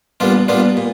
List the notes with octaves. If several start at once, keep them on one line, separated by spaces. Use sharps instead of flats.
A#2 G3 B3 D4 F4
A#2 G3 B3 D4 F4
A#2